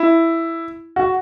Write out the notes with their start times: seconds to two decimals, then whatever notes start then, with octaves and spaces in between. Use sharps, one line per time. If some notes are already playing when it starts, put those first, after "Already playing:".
Already playing: E4
0.96 F#4